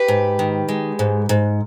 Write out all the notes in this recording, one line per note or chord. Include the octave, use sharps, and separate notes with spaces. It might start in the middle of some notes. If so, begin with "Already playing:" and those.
Already playing: G4 B4
G#2
D#3
G#3
G#2
G#2